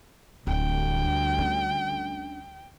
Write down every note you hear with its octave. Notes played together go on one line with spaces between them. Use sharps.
D1 D2 D3 G3 G5
C#4 D4